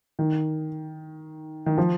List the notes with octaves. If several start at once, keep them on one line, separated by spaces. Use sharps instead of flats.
D#3
D#3
F3